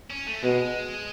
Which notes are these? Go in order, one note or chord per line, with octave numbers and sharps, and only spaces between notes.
C#4
A3
B2 G#3